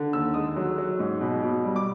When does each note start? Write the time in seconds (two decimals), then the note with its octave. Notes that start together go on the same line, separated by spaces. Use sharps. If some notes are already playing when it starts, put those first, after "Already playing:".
Already playing: D3
0.13 D#2 E6
0.34 G#3 D#6
0.56 F#3
0.78 F#3
0.99 G#2
1.21 B2
1.43 B2
1.64 G3
1.76 D6